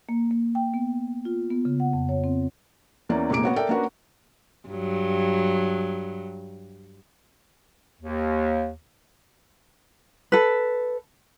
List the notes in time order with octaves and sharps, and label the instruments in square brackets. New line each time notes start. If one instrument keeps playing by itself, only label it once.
[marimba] A#3
A#3
G5
B3
F4
B3
C#3
F#5
F2
C#5
C4
[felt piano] E2 E3 A#3 C#4 D5
F1 A#2 G#3 A#3 D6 D7
B3 F#4 C#5
A4 A#4 D5 E5 G5
A#3 C#4 D4 F#4 A#4 B4
[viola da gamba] G2 F#3
[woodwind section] D#2
[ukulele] A4 B4